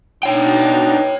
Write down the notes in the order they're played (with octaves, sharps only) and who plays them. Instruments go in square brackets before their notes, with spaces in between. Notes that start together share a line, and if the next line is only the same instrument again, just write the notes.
[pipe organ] B2 D4 D#4 [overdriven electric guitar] C#5 G5